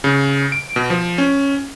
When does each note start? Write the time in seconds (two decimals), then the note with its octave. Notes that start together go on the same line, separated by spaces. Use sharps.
0.04 C#3
0.52 D7
0.76 B2
0.90 F3
1.18 C#4